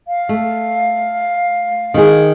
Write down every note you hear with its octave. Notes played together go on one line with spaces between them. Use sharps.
F5
A3
D#3 G#4